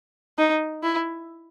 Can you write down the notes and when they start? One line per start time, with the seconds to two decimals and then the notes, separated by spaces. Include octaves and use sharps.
0.38 D#4
0.83 E4